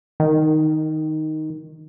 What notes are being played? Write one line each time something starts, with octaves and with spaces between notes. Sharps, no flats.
D#3